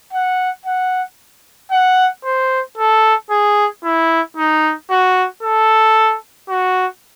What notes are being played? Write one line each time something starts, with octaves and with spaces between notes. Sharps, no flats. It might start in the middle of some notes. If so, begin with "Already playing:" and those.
F#5
F#5
F#5
C5
A4
G#4
E4
D#4
F#4
A4
F#4